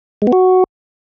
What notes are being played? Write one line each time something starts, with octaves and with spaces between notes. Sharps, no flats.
G#3
B3
F#4